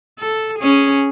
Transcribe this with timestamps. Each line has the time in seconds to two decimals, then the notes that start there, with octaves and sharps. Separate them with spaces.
0.19 A4
0.59 C#4 G#4